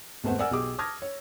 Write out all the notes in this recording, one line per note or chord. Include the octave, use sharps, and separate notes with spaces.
G#1 E2 A3 B4 C5 F#5
A#4 D5 F#5 G#5 E6 F6
B1 G4 G#4 D6
A5 D6 D#6 F6 G#6 A#6
C#5